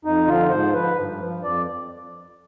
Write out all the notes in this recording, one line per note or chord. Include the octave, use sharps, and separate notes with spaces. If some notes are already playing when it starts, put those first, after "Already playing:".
F2 D#4
D3 F3 F4
G#2 C5
F3 B4
G2
F3
F2 D5